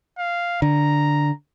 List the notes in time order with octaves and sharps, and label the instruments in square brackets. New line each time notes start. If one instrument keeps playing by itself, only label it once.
[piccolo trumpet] F5
[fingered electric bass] D3 [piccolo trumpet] A#5